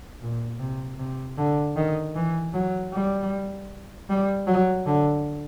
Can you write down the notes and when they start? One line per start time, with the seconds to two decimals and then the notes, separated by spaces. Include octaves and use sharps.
0.22 A#2
0.60 C3
0.99 C3
1.38 D3
1.76 D#3
2.15 E3
2.54 F#3
2.93 G3
4.09 G3
4.47 F#3
4.86 D3